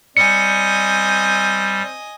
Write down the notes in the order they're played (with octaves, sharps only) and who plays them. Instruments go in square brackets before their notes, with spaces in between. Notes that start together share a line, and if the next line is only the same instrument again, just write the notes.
[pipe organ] G3 [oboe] C4 [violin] D#5 G#5 [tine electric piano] C#7